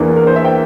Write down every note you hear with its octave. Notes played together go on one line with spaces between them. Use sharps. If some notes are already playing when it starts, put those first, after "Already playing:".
Already playing: E2 E3 A#3 D4
A#4
C5
E5
G5